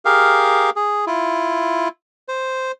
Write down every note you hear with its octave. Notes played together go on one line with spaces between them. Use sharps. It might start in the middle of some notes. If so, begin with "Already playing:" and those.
G4 G#4 A#4 F5
G#4
E4 F4
C5